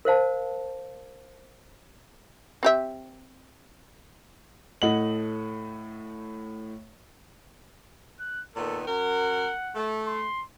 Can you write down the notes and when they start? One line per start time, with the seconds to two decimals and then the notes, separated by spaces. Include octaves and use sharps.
0.05 A#4 C5 F5 A5
2.63 C4 G4 E5
4.82 A2 A3 D#5 F#5 F#7
8.19 F#6
8.56 A#2 D#3 B3 A4
8.87 F#2 A#4 F#5
9.75 A3
10.05 C6